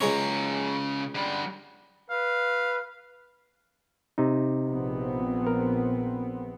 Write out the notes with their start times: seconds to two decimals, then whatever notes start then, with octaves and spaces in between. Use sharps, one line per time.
0.01 C#2 C#3 G#3 C#5 A#5
1.15 D3 G3
2.10 B4 F5
4.18 C3 D#4
4.68 A#1 B3 C4
5.47 A#4